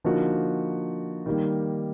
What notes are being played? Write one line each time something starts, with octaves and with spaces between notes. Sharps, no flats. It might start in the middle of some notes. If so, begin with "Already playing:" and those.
D3 F3 A#3 D#4 F#4
D#3 G3 A#3